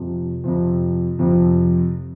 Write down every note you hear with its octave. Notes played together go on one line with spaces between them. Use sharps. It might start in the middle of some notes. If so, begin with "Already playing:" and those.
Already playing: F2 C3 F3
F2 C3 F3
F2 C3 F3